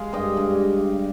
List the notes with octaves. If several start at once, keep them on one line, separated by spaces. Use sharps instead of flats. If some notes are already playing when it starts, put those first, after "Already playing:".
Already playing: G#3 F5
G2 D#5 G5
G2